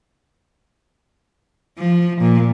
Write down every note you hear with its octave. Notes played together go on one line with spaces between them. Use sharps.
F3
A#2